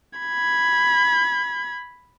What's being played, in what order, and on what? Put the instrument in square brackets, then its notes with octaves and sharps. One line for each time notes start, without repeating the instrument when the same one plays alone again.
[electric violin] B5 G#6